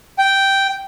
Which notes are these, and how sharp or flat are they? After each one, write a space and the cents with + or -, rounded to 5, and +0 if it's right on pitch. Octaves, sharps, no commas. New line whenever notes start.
G5 -5